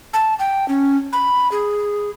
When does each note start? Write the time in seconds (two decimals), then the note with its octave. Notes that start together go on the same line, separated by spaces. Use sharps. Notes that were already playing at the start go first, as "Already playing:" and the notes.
0.14 A5
0.39 G5
0.68 C#4
1.13 B5
1.52 G#4